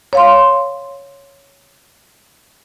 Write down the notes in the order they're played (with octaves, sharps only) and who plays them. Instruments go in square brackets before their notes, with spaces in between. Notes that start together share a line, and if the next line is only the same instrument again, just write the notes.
[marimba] C#5 F5 C6